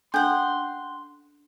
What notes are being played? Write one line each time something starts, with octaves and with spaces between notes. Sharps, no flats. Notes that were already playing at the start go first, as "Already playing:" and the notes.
C#4 D4 A4 F#5 G5 C6 G6